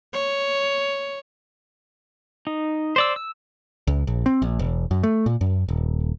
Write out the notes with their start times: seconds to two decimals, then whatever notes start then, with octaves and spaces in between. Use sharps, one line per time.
0.13 C#5
2.47 D#4
2.96 C5 D5 E6
3.16 E6
3.87 C#2
4.07 A#1
4.26 C4
4.42 A#1
4.59 E1
4.91 F#2
5.03 A3
5.26 A#2
5.41 F#2
5.68 D#1